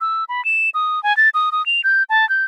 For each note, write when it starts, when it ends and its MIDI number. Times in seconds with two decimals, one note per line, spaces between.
0.01 0.24 88
0.29 0.44 83
0.45 0.70 100
0.74 1.02 87
1.03 1.15 80
1.17 1.29 93
1.34 1.50 87
1.52 1.65 87
1.66 1.81 101
1.84 2.03 91
2.10 2.28 81
2.29 2.45 91